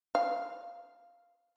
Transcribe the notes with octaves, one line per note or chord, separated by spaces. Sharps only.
F5